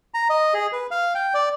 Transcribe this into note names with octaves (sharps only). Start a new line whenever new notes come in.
A#5
D#5
G#4
B4
F5
G5
D5